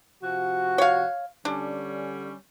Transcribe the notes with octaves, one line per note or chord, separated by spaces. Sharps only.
C3 F3 F#4
C#5 F5
D3 G3 C#4 D4